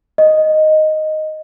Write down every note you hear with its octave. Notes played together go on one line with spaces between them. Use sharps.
D#5